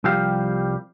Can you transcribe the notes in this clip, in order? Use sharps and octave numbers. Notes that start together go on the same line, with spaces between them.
C2 F3 G3 G4 F5